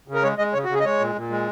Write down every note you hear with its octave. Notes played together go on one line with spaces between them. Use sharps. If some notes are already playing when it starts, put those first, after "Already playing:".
C#3
A#4
G#3 C#5
G#3 D#5
C#3 C#5
C#3 F#4
G#4
D#5
G#3 C#5
A#2
A#2
G#3